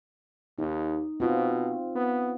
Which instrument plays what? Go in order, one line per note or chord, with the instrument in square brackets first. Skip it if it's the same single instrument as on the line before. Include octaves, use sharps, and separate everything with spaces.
[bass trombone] D#2 [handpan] D#4
[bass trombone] B2 [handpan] C4 F4
[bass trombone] B3